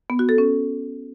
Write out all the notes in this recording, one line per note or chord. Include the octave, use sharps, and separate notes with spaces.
B3
F#4
A4
C#4